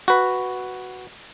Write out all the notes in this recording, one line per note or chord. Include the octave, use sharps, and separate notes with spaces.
F#4 B4